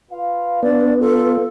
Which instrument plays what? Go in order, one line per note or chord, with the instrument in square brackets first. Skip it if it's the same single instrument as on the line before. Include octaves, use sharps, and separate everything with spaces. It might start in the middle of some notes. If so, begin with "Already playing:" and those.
[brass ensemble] F4 B4 F5
[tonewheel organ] B3 [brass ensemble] D4 [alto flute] D5
[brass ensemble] F4 [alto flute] A4